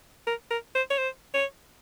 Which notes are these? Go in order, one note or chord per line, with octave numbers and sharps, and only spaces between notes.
A#4
A#4
C5
C#5
C5
C#5